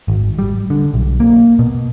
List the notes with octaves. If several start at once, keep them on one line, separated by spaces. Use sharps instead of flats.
G#1
G3
D3
B1
A#3
B2